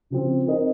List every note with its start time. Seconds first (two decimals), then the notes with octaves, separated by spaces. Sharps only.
0.10 C#3 F3 C4
0.46 C4 D#4 A#4 D#5